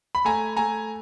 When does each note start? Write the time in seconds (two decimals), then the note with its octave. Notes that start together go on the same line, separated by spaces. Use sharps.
0.15 B5
0.24 A3 G#5 A#5
0.57 A3 G#5 A#5